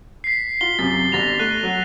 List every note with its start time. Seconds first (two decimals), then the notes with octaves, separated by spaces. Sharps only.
0.24 B6 C7
0.61 F4 G7
0.79 F#2 C3 A6
1.12 G1 G3 A6 A#6 F7
1.39 A3 F#6 D#7
1.63 F#3